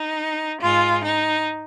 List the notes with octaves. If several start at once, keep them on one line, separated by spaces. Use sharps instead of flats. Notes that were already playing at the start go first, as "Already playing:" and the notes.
Already playing: D#4
G#2 G#3 F4
D#4